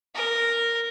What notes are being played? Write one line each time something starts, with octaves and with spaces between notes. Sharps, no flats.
A#4